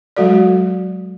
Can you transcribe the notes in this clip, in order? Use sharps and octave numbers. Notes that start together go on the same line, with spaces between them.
F#3 G#3 F#4 A4 D5